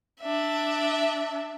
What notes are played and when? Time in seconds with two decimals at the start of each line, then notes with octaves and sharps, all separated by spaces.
0.20 D4 E5